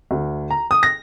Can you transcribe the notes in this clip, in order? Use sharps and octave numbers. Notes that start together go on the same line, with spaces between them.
D2
A#5
D#6
A#6